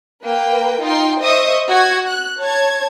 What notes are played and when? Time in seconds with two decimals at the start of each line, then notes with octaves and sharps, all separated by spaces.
0.23 A#3 B4 G5
0.82 D#4 F4 G5 C6
1.20 C5 D#5 E5 C#6 D#6
1.69 F#4 G#6
2.07 F#6
2.40 C#5 A5 G#6